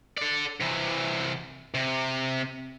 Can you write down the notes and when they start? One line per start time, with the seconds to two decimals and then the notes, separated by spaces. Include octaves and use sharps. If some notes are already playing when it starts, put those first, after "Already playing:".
0.18 A4 D5
0.61 C3 E3
1.74 C3